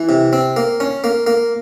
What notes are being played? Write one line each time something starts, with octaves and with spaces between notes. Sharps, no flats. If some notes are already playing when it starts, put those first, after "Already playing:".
Already playing: E3
C3
C4
A#3
C#4
A#3
A#3